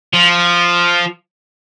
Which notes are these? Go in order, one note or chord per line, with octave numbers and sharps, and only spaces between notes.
F3